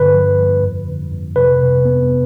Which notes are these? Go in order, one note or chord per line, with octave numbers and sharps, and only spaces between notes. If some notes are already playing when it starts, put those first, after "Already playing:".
Already playing: G2 D3 B4
F3
F3
F2
D3
F2
C3 B4
C3
B3